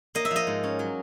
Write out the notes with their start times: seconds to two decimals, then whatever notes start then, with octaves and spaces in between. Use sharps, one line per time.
0.15 A#3 D#5
0.25 E5
0.31 F3
0.36 D#5
0.47 G#2
0.64 C#4
0.79 F#3